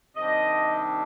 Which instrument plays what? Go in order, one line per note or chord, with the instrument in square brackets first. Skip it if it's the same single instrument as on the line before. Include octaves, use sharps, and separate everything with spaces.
[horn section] C3 D#3 G3 D4 D#5